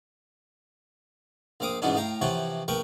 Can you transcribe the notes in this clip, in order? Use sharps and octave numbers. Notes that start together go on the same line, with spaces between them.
A#1 C4 F5 D6 D#6
G#2 B2 E3 B3 C#4 D4
A2 F5 G5 A#5
C3 E3 F3 C#5 F#5 G5
A#1 A#4 B4 G5 C#6